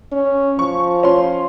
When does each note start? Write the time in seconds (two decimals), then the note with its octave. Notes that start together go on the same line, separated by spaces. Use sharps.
0.12 C#4
0.59 F3 C#6
1.03 C#4 F4 C6